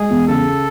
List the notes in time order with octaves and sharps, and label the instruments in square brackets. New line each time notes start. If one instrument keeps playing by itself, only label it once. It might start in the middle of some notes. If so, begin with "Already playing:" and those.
Already playing: [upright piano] G#3 [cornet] G#4
[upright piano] E2
[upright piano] C#3 [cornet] A4